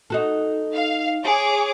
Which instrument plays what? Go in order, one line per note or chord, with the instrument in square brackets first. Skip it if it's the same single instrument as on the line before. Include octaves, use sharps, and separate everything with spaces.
[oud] D#4 F#4 A4
[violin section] F5
G#4 C#5 D6